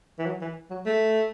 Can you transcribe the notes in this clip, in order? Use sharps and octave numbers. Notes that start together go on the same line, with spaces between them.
E3
F#3
E3
F#3
A3